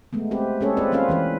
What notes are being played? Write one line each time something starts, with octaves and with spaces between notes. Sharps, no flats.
G#3 A3 B3
C4 G4 B4
G#3 A#3 C#4 G#4 A4 C#5
C4 F4 B4 D5
A#3 C4 C#4 F4 B4 F5
E3 C#4 B4